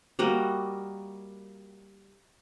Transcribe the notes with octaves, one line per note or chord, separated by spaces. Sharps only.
G3 A#3 F#4 D#5